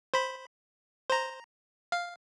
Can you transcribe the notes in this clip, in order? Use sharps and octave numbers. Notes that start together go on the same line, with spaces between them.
C5 B5
C5 A#5
F5